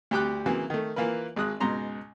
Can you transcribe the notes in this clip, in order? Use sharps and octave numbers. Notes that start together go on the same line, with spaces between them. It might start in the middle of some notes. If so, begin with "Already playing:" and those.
D2 G3 G4 G5 D6 F#6
C#3 E3 F#3 A#3 C4
D#3 A3
E3 A#3 F4 A#4 B4
G#1 G#3 D#6 F#6
C#2 G#2 B2 A#5 C6